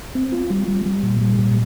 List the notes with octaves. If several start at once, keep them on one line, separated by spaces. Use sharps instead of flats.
C4
F4
G3
G3
G3
A#2
G3
A#2